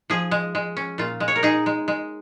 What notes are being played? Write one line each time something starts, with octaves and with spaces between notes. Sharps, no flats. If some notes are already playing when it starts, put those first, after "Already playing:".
F3 G#4
G#3
G#3
C#4
A#2 F4
G#3
C#5
A#4
D#4 G#4
G#3
G#3